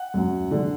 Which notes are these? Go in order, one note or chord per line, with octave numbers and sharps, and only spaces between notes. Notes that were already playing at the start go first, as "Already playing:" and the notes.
Already playing: F#5
F#2
D3